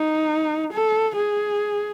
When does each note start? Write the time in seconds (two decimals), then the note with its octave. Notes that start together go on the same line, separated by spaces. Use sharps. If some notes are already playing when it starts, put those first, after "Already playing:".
Already playing: D#4
0.73 A4
1.16 G#4